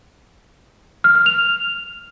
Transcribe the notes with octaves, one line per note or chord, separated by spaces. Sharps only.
F6
F6
F7